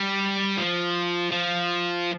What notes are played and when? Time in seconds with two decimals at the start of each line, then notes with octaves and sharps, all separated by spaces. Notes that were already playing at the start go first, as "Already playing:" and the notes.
Already playing: G3
0.57 F3
1.32 F3